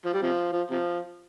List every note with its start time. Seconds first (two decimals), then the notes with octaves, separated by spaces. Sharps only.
0.05 F3
0.14 G3
0.22 C3 F3
0.52 F3
0.70 C3 F3